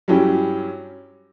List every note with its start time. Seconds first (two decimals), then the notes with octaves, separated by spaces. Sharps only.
0.08 G2 F#3 C#4 E4 G4